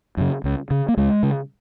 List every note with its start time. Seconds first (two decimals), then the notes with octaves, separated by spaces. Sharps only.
0.17 F#2 C#3
0.44 C#2
0.71 C#3
0.89 A#3
0.97 C#2 G#3
1.23 C#3